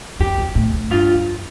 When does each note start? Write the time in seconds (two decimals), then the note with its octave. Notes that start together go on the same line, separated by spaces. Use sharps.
0.20 F2 G4
0.38 F2
0.55 A2
0.73 A2
0.90 G2 F4
1.15 F2